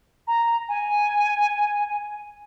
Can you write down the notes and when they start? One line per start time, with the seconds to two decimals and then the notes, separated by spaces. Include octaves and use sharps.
0.28 A#5
0.69 G#5